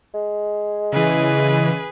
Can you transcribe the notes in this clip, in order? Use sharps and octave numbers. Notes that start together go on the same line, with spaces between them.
G#3
C#3 E3 G#4 B4